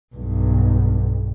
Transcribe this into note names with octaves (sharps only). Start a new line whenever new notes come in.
B1 G2